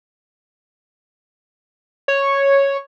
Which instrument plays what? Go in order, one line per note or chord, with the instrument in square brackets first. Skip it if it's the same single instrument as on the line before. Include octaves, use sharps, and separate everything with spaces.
[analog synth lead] C#5